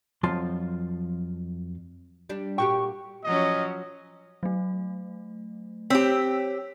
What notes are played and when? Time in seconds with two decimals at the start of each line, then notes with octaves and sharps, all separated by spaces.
0.23 F2 F3 F#3 F4 A5 C6
2.29 G3 D4
2.58 A#2 F#4 G4 G5 C#6
3.24 F3 F#3 C#4 D#5
4.43 F#3 A3
5.90 C4 G4 C#5 E6 B6